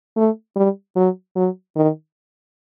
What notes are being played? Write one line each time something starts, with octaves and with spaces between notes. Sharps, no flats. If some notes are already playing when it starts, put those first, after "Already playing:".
A3
G3
F#3
F#3
D#3